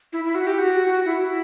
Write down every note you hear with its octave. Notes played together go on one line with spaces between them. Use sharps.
E4
E4
F#4
G4
F#4
E4